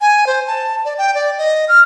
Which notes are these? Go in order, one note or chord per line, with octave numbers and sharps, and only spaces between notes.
G#5
C5
A5
D5
G5
D5
D#5
F6